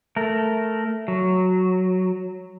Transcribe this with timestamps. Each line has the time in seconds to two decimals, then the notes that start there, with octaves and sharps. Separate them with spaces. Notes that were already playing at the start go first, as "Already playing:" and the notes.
0.16 A3 A#4
1.08 F#3